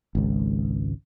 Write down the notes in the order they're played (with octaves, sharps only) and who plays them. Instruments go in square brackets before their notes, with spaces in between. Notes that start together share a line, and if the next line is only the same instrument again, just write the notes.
[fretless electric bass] G#1 C#2